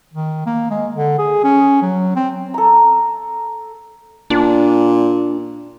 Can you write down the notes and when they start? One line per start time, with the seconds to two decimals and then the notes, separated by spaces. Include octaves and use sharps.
0.14 D#3
0.46 A#3
0.70 G#3
0.96 D3
1.18 G#4
1.44 C#4
1.82 F#3
2.16 C4
2.54 A4 A#5
4.30 A#2 D4